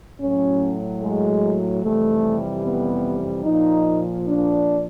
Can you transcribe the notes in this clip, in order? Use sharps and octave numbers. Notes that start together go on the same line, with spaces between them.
A2 F#3 C#4
G#3
F2 C3 E3 G3 A3
B3
A#2 F3 D#4
D4